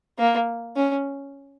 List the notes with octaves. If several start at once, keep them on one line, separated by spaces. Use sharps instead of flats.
A#3
C#4